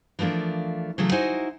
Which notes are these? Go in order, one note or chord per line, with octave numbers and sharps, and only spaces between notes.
E3 F3 A3 A#3 D4
C#3 E3 F#3 A3
D#4 E4 F#4 C5 D#5 G#5